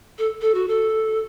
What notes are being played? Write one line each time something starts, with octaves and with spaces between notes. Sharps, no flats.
A4
A4
F#4
A4